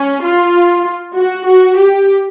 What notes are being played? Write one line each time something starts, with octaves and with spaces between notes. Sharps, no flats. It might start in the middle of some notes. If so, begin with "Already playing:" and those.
Already playing: C#4
F4
F#4
F#4
G4